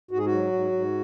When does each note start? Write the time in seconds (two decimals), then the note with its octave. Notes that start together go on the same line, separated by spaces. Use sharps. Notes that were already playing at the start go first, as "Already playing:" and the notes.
0.11 G#2 F#4
0.18 G#4
0.26 F#4
0.32 F#3
0.52 G#2
0.72 G#2